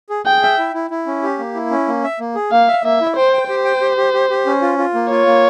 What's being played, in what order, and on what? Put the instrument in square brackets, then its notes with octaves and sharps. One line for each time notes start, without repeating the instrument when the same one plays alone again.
[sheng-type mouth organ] G#4
[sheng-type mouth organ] G#4 [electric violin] G5
[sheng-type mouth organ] E5
E4
E4
E4
C#4
G4
A#3
E4
C#4
A#3
E5
A#3
G#4
[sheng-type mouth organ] A#3 [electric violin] F5
[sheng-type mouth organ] E5
[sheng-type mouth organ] A#3 [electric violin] E5
[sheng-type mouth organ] E4
[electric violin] C5 [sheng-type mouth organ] G5
[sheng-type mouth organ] G5
[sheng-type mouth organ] G4 [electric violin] C5
[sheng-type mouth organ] G5
G4
G4
G4
G4
C#4
F4
F4
A#3
[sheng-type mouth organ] F4 [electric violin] C#5
[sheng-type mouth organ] A#3